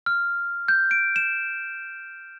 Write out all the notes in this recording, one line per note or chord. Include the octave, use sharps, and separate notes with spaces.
F6
G6
D7
E7